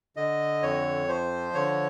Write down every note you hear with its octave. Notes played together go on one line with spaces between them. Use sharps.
D3 D#5
F2 C#5
F3 C5
D3 C#5